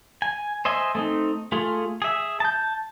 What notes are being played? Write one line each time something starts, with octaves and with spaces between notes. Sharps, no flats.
G#5
C5 D#5 E5 G#5
A3 C4 D#4
A3 F4 G#4
G#4 E5
A5 G6